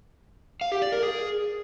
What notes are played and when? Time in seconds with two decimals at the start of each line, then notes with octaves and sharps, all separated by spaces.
0.61 F5
0.72 G4
0.82 D5
0.92 A#4
1.03 G#4